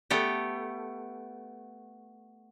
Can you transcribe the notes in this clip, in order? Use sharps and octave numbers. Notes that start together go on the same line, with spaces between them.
A3 B3 G4